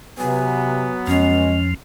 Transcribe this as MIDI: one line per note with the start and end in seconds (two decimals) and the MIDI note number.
0.18 0.91 48
0.18 1.59 54
0.18 1.59 59
0.18 0.92 80
1.07 1.74 41
1.07 1.74 53
1.07 1.59 56
1.07 1.68 61